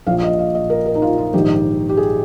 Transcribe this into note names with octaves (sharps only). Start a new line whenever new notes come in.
A#1 A#2 F5
D#5
F5
D#5
A#4
A#4
D#4
F4
F4
A#1 G#2 D#3 G4
G4
G#4